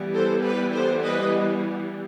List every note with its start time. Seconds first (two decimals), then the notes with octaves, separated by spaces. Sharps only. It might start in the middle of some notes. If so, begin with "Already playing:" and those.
Already playing: E3 G3 B3
0.13 A4 C5
0.44 G4 B4
0.73 A4 C5
1.03 B4 D#5